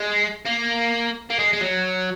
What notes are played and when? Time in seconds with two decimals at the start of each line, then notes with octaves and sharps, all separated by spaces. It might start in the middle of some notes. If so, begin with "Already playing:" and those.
Already playing: G#3
0.46 A#3
1.30 A#3
1.39 G#3
1.53 G#3
1.61 F#3